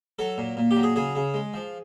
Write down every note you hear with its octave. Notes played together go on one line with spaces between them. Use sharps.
F#3 A4
A#2
A#2
G4
F#3
G#4
C#3 G#4
C#3
G#3
F3